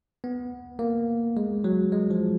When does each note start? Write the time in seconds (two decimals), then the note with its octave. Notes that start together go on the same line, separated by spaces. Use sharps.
0.24 B3
0.79 A#3
1.37 G#3
1.64 F#3
1.92 G#3
2.11 F3